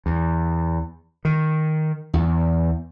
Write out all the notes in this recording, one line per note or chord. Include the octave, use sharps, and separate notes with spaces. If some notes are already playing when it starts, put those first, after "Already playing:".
E2
D#3
E2